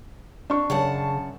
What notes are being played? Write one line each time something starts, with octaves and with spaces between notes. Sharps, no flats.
D4 C#6
F#2 C#3 F#5 A5